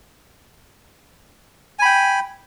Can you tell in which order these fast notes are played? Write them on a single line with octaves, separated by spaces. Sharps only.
G#5 B5 G5